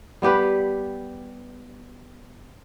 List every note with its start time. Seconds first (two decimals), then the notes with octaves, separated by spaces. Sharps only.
0.22 G3 B3 G4 B4